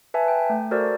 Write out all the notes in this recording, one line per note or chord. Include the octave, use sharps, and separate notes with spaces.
B4 E5 G#5 A5
G5
A3
F#4 A4 A#4 C5 D5